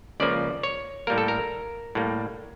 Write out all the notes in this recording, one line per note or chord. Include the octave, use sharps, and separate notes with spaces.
C#2 C#3 F3 A#3 D5
C#5
A2 G3 A#3 A#4
A4
A#4
A2 G3 A#3